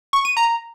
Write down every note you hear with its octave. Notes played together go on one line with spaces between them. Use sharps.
C#6
D#7
A#5